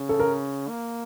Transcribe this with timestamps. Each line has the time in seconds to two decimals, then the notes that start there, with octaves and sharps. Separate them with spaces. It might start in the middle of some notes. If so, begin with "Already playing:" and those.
Already playing: C#3
0.09 A4
0.20 A#4
0.68 A#3